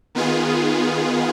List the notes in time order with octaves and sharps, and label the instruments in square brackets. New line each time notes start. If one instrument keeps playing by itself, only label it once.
[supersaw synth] D#3 B3 F4 G#4